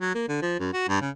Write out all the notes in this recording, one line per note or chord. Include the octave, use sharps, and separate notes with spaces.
F#3
A#3
D3
F3
F#2
F#4
G2
C#3